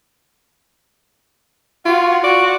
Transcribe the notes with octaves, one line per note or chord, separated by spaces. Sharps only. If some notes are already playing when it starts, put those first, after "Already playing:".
F4 F#4
F#4 D5